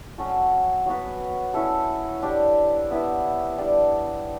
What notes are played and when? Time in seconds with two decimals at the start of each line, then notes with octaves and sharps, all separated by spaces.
0.18 F#3 C#4 F#4 A4
0.86 F#3 B3 F#4 B4
1.54 C#4 E4 A4
2.22 D4 G4 D5
2.91 B3 E4 B4 E5
3.58 G3 D4 A4 D5